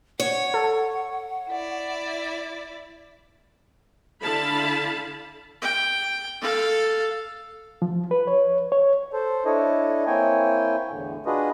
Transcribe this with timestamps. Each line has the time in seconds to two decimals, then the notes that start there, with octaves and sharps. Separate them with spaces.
0.20 C#5 F#5
0.54 A4
1.50 E4 D5
4.21 D3 E4 F5 A5 B5
5.62 G5
6.41 A4 F5
7.82 F3
8.11 B4
8.27 C#5
8.72 C#5
9.12 A4 C5
9.45 D4 E4 A4 C#5 D#5
10.07 A#3 C4 E4 C#5 G5 G#5
10.89 E2 A2 D3
11.26 D4 F4 F#4 G#4 B4 D#5